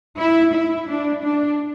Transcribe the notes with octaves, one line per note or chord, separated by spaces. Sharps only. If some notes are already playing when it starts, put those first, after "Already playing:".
E4
E4
D4
D4